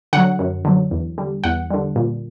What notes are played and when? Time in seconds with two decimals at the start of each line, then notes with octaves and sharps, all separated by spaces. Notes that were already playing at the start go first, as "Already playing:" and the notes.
0.13 D3 F#3 F#5
0.39 F#2
0.65 D3 F#3
0.91 E2
1.18 D3 G3
1.44 E2 F#5
1.70 D3 G3
1.96 A#2